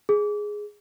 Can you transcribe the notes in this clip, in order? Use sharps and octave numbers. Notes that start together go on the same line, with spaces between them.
G#4